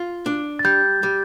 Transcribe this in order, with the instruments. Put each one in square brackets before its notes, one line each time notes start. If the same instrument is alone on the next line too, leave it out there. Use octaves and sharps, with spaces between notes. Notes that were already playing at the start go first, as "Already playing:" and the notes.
Already playing: [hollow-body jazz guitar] F4
D4
[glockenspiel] A6
[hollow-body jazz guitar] G3 [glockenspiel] G6
[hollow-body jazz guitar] G3